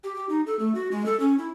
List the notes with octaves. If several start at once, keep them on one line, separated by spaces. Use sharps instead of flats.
G4
G4
D#4
A4
A3
F#4
G#3
A4
C#4
E4